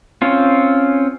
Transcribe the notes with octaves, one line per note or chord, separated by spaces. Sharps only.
C4 C#4 F4